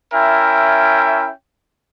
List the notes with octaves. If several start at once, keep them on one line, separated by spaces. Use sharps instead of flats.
C#4 E4 A#4 E5 G5